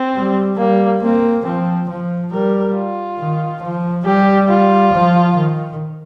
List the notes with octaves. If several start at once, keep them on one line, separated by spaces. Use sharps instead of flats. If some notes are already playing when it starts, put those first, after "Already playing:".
Already playing: C4
G3
G3 A#3
A#3 C4
F3 C4
F3
G3 A#4
F4
D#3
F3
G3 G4
F4
F3
D#3